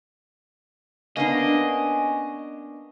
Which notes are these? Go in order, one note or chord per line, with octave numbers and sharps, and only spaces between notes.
A#3 B3 C#4 D4 D#5